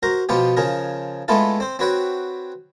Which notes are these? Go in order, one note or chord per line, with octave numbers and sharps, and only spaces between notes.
F#4 A#4 C5 A#5
B2 F3 B3 F4 G4
C#3 F3 G#4 A#4
G#3 A3 B3 E4 F4 A4
C4 C5
C4 F#4 B4 C#5 F#5 G5